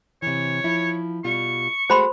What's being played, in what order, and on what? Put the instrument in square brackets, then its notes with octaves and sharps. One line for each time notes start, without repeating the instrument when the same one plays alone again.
[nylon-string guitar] C3 E3 [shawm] C#5
[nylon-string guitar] F3 E4
[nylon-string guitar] B2 G3 F4 [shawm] C#6
[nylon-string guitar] G#3 A3 F#4 [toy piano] C5 B5 C6